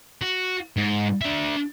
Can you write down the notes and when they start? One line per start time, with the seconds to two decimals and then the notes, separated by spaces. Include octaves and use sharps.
0.22 F#4
0.77 G#2
1.21 D4 E5